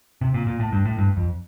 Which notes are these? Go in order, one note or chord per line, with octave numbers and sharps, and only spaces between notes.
C3
A#2
A#2
A2
G2
A2
G2
F2